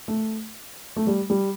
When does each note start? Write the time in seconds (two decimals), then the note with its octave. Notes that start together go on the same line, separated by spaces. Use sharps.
0.08 A3
0.97 A3
1.07 G3
1.30 G3